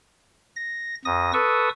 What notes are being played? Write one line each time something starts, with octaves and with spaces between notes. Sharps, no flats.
A#6
F2 D#6 A#6
A4 B4 C#6 D#6 E6